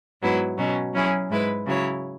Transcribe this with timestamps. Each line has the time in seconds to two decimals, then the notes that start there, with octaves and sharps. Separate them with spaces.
0.21 G#2 F#3 B3 E4
0.57 B2 F#3 C#4
0.93 F#3 C#4 E4 G#4
1.29 G#2 G#3 E4 B4
1.65 C#3 F#3 E4 C#5